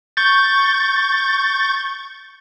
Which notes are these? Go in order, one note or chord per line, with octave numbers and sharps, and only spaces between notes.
C#6 G6 A6